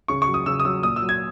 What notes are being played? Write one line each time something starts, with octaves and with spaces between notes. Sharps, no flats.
C#3 C#6
C#6
F#3
D#6
C#3 E6
D#6
F#3 E6
A#2 D#6
E6
F#3
G#6